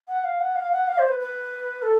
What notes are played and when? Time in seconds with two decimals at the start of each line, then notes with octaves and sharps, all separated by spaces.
0.08 F#5
0.24 F5
0.40 F#5
0.55 F5
0.72 F#5
0.87 F5
0.98 C5
1.08 B4
1.19 B4
1.82 A4